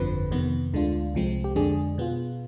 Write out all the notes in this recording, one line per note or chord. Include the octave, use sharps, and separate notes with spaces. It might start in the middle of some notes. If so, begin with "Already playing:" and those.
Already playing: G1 F2 D3 F3 C4 B4
F2 C3 D#3 B3
D2 D3 G#3 D4 F4
C2 C3 F3 G#3 C4
G4
F2 D3 G#3 D4 G#4
B2 B3 F4